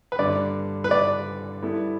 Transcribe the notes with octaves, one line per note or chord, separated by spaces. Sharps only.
B4
G2 D3 G3 D5
B4
D5
G3 B3 E4 A4